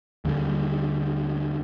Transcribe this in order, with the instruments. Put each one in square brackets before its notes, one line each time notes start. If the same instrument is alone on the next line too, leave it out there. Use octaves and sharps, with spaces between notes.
[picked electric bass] D#2 D3 F#3 G3